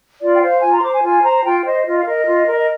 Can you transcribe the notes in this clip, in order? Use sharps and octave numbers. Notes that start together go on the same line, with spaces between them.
F4 D5
G5
C5 F5
F4 G#5
A#5
C6
C5 D6
G#5
F4 G#5
C5 A#5
F4 G5
C5 D#5
F4 D#5
F5
A#4 D#5
F4
A#4
D#5